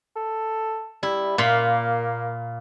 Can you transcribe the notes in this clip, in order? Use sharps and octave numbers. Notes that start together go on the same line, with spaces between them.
A4
G3 E4
A#2 A#3 F4 B5